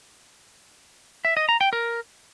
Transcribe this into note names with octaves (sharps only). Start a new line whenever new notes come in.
E5
D#5
A#5
G5
A#4